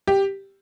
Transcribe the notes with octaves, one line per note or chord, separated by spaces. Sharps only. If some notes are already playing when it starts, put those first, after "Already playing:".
G4